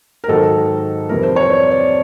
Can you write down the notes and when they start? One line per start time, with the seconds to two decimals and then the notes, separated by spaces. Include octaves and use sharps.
0.24 A#4
0.28 G#2 D#3 F#3 A4
1.09 F2 C3 E3 G3 A#4
1.23 C5
1.36 C#5
1.50 D5
1.71 D5